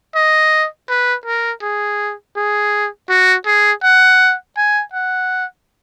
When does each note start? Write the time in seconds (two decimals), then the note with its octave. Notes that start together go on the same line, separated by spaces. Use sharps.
0.15 D#5
0.89 B4
1.26 A#4
1.62 G#4
2.36 G#4
3.09 F#4
3.46 G#4
3.83 F#5
4.57 G#5
4.94 F#5